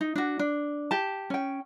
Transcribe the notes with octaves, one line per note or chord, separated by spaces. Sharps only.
D#4
D4 F#4
D4
G4 A5
C#4 G5